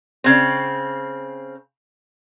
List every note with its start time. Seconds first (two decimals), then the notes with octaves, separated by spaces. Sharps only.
0.24 C#3 C4